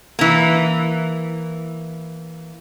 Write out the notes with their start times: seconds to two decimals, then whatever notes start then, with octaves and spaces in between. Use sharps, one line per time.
0.19 E3 A#3